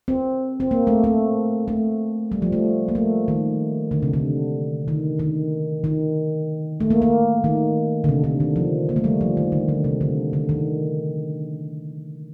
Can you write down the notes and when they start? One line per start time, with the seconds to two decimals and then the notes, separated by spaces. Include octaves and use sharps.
0.08 C4
0.60 C4
0.71 A#3
0.87 A3
1.04 A3
1.68 A3
2.32 G3
2.42 F3
2.52 A3
2.88 A#3
2.95 A3
3.28 D#3
3.91 D3
4.03 C3
4.13 D3
4.88 D#3
5.19 D#3
5.84 D#3
6.80 A3
6.90 A#3
7.02 A#3
7.44 D#3
8.04 D3
8.09 C3
8.24 D3
8.40 D#3
8.56 F3
8.89 A#3
8.96 A3
9.04 G3
9.21 F3
9.37 D#3
9.52 D3
9.68 D3
9.84 C3
10.01 D3
10.33 D3
10.49 D#3